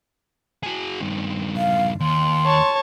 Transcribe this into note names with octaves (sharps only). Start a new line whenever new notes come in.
F#4 G#4
G2 D#3
F5
D#2 C6
C#5 A5